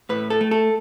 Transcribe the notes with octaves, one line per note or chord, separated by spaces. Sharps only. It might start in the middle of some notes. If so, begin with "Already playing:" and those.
A2 B4
A4
A3
A4